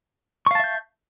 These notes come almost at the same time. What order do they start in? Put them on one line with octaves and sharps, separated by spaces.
C#6 F5 A5 E5 G6